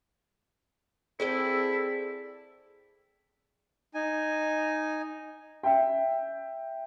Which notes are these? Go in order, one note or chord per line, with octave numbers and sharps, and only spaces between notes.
C4 E4 G#4 A4 D5 G5
D#4 G#5
E5 G5